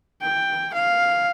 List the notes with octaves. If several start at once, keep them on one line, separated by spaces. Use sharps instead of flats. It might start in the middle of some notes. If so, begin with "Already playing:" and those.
G5
F5